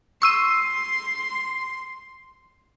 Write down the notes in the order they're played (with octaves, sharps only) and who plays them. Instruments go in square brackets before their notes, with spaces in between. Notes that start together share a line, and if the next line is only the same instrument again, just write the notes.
[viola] C6 [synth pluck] C#6 E6 D#7